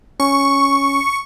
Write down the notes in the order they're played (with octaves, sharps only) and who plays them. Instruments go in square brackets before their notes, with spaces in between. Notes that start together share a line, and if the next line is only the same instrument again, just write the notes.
[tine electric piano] C#4 [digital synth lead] C#6